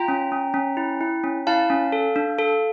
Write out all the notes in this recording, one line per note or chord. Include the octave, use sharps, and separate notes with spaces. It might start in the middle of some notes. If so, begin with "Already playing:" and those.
Already playing: F4 G5 A#5
C#4
C#4
C#4
E4
E4
C#4
E4 F5 A5
C#4
A4
D4
A4